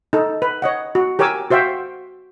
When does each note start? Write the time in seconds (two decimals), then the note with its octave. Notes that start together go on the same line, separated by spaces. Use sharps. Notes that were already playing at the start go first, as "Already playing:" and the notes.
0.13 D#4 A4
0.42 B4
0.62 C#5 D#5 F#5
0.95 F#4
1.19 G4 A#4 C#5 G#5 D6 E6
1.51 F#4 C5 E5 F5 G5